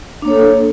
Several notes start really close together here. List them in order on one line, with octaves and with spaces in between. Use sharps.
D4 A#3 C#5 A4